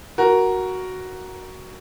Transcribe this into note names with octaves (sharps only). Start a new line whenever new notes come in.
F#4 A#4